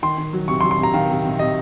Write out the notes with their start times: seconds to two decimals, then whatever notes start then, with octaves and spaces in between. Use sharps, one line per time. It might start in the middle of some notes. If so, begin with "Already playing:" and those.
0.03 D#3 C6
0.18 D#3
0.33 F#3
0.48 C3 C#6
0.61 C6
0.63 F#3
0.71 C6
0.79 C3 A#5
0.94 D#3 F5
1.10 C3
1.24 C3
1.39 C3 D#5